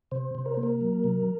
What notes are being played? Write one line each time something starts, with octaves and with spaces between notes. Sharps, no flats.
C3 C5
C3
A#4
A#3 C5
A#4
F#3
C3